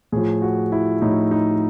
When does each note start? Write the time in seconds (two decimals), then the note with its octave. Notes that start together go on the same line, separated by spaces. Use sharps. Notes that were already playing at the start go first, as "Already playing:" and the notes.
0.12 A2 F3 G#4
0.42 F#4
0.72 E4
1.02 A2 F3 D#4
1.31 D#4